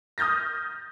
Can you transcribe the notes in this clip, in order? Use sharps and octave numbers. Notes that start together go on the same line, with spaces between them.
D#6 F6 G6 A6 A#6